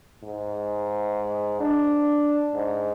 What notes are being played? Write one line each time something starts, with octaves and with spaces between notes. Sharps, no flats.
G#2
D4
G#2